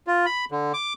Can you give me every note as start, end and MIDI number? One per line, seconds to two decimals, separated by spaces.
0.07 0.26 65
0.26 0.45 83
0.51 0.73 50
0.74 0.93 86